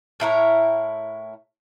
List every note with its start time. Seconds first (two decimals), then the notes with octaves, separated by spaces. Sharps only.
0.20 A2 E4 A#4 C#5